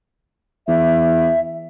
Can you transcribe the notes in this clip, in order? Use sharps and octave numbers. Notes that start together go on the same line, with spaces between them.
E2 E5